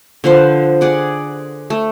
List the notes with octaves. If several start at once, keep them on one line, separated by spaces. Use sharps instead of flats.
D3 F3 B4 C5
G#4 D5 F#5
A3